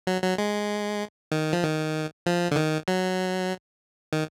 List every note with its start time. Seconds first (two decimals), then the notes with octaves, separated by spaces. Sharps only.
0.07 F#3
0.23 F#3
0.38 G#3
1.32 D#3
1.53 F3
1.63 D#3
2.26 F3
2.51 D3
2.56 D#3
2.88 F#3
4.13 D#3